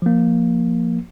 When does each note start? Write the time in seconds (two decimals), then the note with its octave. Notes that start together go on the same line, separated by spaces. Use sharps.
0.02 F3 A#3